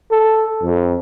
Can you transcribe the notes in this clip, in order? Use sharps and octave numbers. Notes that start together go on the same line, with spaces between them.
A4
F2